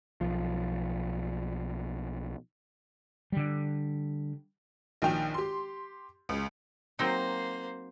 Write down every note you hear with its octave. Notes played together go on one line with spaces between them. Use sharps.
B1 F3
D3 G3
A#1 D#3 G5 F7
G4 C6
C#2
F#3 A#3 C4 D#4 C5